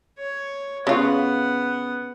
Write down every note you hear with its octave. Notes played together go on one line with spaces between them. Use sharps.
C#5
C#3 B3 F4 F#5